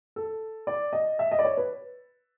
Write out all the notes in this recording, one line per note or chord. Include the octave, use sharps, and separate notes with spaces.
A4
D5
D#5
E5
D#5
D5
C#5
B4